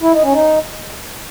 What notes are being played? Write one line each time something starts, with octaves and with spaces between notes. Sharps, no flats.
E4
D#4
C#4
D#4